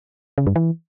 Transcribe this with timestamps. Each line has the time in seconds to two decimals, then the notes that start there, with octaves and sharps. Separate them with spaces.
0.38 C#3
0.47 G2
0.56 E3